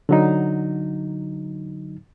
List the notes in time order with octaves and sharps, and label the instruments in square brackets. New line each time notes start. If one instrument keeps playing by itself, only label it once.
[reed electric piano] D3 F#3 D#4